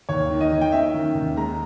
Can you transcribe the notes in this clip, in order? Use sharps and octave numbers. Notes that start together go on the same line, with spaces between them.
D#2 C#5
D#3
D#5
D#3
G5
C#4 E5
D#3
D#2
G#3 A#5